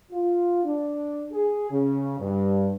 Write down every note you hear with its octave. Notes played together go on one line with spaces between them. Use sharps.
F4
D4
G#4
C#3
G2